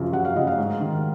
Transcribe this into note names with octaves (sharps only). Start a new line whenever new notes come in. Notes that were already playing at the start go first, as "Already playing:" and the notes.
Already playing: F#2 C#3 F3
F#2 F#5
F5
C#3 F3 D#5
F5
G#2
D#3